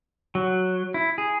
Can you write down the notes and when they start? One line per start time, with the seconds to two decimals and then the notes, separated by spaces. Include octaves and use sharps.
0.35 F#3
0.94 E4
1.18 G#4